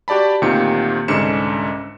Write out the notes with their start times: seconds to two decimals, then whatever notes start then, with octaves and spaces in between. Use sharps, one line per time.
0.08 F#4 G4 D5 A5 B5
0.42 D2 A#2 D#3 C4 G4 C#7
1.08 C2 G#2 D3 C#4 C#7 E7